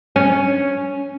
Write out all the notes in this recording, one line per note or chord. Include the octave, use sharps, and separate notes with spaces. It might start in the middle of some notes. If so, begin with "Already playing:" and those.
C#4